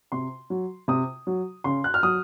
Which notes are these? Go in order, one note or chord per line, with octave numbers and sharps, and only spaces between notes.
C3 C6
F#3
C3 D#6
F#3
C#3 C6
F#6
F6
F#3 D#6